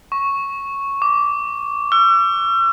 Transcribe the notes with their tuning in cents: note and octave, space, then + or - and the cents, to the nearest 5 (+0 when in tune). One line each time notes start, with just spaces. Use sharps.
C#6 -5
D6 -15
E6 +45